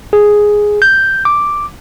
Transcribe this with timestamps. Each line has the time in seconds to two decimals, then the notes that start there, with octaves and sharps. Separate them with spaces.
0.13 G#4
0.82 G6
1.25 D6